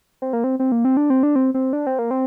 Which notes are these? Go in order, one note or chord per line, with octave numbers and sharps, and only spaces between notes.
C4
A#3
C4
C4
A#3
C4
D4
C4
D4
C4
C4
D4
C4
A#3
C4